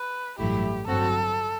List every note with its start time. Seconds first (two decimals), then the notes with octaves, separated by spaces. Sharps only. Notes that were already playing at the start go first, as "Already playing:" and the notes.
Already playing: B4
0.39 A1 G2 F#3 A3 E4 G4
0.87 G1 G2 F#3 C4 F#4 A4